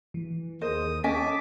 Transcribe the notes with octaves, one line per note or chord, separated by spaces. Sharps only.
E3
D#2 G#4 A#4 C5 D#5 D#6
C#4 D#5 G#5 A5 D6 B6